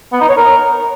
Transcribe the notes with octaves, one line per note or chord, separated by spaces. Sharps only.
B3
D#4
C#5
A#4